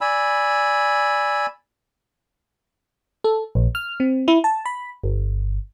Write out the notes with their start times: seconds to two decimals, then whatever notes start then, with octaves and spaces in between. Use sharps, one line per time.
0.01 D5 G#5 B5 E6
3.24 A4
3.55 A#1
3.75 F6
4.00 C4
4.28 E4
4.44 A5
4.65 B5
5.04 G1